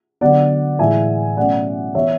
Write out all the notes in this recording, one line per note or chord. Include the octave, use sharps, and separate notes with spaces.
D3 F#3 B3 D5 F#5
A2 E3 G#3 E5 G#5
B2 F#3 A3 C#4 D5 F#5
E3 B3 C#5 E5